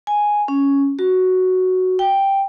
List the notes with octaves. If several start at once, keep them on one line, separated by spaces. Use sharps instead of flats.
G#5
C#4
F#4
G5